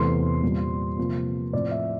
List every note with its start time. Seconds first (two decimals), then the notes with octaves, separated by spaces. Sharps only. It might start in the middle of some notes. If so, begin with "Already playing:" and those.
Already playing: E2 C3 E3 A3 C6
0.42 A#2 G3 C4
0.98 C3 F3 A#3
1.53 A2 F3 C4 D5
1.71 E5